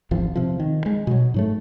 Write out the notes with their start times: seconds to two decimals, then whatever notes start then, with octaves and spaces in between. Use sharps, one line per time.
0.11 G#1 E2 F3
0.36 C3 F3
0.60 D#3
0.86 G#3
1.07 B2 F#3
1.34 G#2 F#3 A3